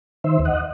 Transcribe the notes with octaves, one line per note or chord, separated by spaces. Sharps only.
D#3 C5 E5
D#2
D#5 F#5